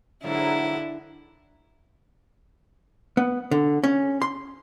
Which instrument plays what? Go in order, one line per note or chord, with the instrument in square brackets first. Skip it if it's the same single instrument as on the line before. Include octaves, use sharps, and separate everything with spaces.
[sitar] G#2 F#3 A#3 [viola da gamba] D3 E4
[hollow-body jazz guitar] B3
D3
C#4
C6